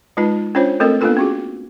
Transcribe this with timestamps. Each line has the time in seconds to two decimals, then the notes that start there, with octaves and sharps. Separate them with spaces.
0.17 G#3 D#4 F4 B4
0.55 C#4 D4 F4 C5 C#5
0.80 A3 C4 A4 A#4 D#5
1.01 A#3 B3 D4 F4 A4 B4
1.17 C#4 F#4 G#4